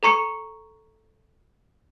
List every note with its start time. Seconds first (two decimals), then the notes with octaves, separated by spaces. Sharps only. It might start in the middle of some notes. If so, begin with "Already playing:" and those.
0.03 A4 A#5 C#6 C#7